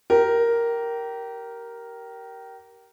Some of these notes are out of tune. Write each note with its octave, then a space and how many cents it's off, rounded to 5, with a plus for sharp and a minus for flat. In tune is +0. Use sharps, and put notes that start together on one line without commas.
G4 -20 A#4 +0